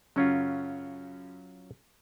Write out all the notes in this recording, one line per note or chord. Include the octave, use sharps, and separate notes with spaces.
F#2 C#3 F#3 C#4 F4